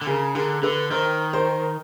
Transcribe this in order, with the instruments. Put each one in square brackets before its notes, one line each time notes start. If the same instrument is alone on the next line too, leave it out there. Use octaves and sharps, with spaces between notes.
[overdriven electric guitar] D3
[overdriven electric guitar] C#3 [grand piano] G#4 A#4
[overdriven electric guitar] D3 [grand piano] G#4 A#4
[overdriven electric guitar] D3 [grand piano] A4 B4
[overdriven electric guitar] D#3 [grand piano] A#4 C5
[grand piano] A#4 C5